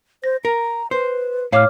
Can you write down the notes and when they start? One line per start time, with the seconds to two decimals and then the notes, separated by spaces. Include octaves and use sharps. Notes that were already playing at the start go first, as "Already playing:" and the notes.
0.24 C5 A#6
0.45 A#4 A#5
0.91 B4 C5
1.52 A2 C#5 F5 D6 F6